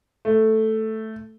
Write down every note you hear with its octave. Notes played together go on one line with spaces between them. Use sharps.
A3